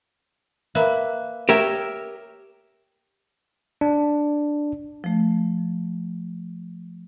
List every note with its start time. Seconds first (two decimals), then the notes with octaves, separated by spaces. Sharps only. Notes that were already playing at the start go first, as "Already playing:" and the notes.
0.75 A#3 B4 E5
1.49 G4 A#4 C#5 E5
3.81 D4
5.04 F3 A3